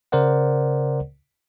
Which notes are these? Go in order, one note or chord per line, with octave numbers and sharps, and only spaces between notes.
C#3 A#4 C5 D5 F#5